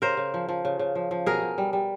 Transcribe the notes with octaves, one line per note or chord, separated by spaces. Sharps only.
C#3 A#4 C5
C#3
F3
F3
C#3
C#3
F3
F3
B2 G#4 A#4
B2
G3
G3